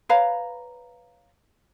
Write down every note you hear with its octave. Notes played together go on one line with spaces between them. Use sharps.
B4 C#5 F5 A#5